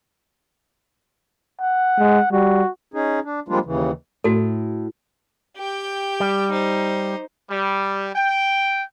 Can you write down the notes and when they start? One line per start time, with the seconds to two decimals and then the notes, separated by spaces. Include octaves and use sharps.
1.61 F#5
1.99 G#3
2.32 G3 F#4
2.94 C#4 D#4 G#4
3.25 D4
3.48 F3 G3 G#3 A#3 D4 F4
3.65 D#2 C#3 E3
4.24 A2 F#4 A4
5.57 G4 G5
6.20 G3
6.51 D#4 C5
7.50 G3
8.15 G5